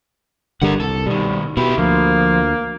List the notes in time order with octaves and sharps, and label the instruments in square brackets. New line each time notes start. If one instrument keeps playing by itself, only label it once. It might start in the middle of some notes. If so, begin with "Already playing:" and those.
[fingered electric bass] G1 D3 G3 [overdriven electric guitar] A#4 F#5
[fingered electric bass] C2 [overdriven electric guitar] A4
[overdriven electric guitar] B2 D#3 [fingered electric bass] G3
[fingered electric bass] B2 [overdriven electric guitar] E4 G4
[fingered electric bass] D2 [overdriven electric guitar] F3 [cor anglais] A#3